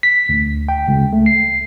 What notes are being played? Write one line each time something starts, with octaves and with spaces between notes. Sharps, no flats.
B6
D2
G5
C#2
A3
C7